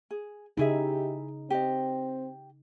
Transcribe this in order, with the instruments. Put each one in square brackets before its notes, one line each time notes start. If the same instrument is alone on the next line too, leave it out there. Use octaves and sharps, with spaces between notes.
[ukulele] G#4
[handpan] C#3 D#4 [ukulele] E4 G#4 E5 [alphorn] G4
[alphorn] C4 [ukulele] G4 D#5